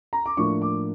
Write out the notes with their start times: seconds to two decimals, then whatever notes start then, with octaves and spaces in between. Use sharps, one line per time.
0.13 A#5
0.26 D6
0.37 A2 F3 A#3 D4 C#6
0.62 D6